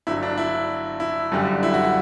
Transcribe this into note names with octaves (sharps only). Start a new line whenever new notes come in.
G1 G2 F#3 E4
D4
E4
E4
G1 F#2 D3 G3
E4
F#4
F#4